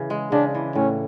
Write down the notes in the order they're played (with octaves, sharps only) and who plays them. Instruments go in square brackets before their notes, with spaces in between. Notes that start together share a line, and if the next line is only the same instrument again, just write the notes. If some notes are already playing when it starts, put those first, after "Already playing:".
Already playing: [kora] C#3 E3
G#3
[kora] C#3 [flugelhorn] D4
[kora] E3
[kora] A2 [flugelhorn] C#4